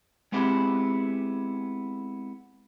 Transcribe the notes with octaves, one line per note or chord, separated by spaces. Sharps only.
G#3 B3 C4 E4 G4 G#4